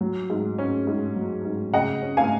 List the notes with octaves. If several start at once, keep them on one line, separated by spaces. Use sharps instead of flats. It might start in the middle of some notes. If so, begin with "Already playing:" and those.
F#3
G#2
C#4
G#2
F#3
G#2
C#3 D#5 F#5
C#4
F5 G#5